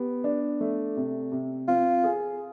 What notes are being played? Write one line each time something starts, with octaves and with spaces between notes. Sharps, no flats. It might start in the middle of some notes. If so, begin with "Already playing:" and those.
Already playing: B3 G4
D4
A3
C3
C3
C4 F4
G#4